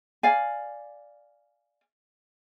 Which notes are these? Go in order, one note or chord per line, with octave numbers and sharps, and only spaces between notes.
D5 F5 G#5